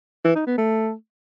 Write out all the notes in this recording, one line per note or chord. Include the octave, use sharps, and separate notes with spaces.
E3
D#4
B3
A3